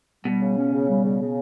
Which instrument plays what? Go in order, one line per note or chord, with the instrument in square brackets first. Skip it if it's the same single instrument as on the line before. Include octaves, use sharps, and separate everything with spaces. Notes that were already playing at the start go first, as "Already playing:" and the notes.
[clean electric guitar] B2 [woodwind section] G3
[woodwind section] C#3
C#4
C#3
G3
C#3
C#3